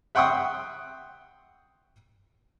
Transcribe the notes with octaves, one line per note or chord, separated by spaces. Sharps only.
E5 F#5 G5 C6 C#6 D#6